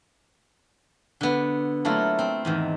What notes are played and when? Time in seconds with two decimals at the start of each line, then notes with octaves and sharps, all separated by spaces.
1.21 D3 B3
1.85 F#3 A3 A#3 E4 F4
2.19 C4
2.45 E2 G#2 D#3